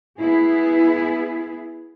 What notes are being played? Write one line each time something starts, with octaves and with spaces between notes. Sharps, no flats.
B3 E4 G#4